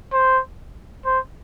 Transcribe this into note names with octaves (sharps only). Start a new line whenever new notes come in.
C5
C5